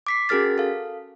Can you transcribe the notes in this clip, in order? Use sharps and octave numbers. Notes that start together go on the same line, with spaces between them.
D6 B6 C7
C#4 F#4 G#4 A#4 F6 A6
A4 F5